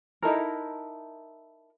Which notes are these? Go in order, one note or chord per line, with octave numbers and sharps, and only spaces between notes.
D#4 E4 A4 A#4